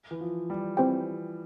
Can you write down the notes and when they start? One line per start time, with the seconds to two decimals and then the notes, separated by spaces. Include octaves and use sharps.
0.11 E3
0.21 F3
0.50 G3
0.77 E3 C4 G4 C5 G5